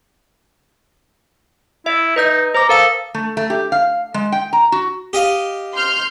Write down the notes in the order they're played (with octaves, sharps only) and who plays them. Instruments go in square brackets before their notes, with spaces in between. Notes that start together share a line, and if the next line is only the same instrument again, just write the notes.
[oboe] E4 [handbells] E5
[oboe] D#4 [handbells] B4 D#5 G6
[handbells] C5 D6 [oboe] A#5
[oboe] A4 [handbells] A#4 F5 D#6
[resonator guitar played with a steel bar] A3
A3
G4
F5
G#3
G5
A#5
F#4
[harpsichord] G4 D#5 F5
[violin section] C6 F6 G6